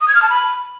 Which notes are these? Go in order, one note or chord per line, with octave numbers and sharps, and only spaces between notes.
D#6
G#6
F6
A5
B5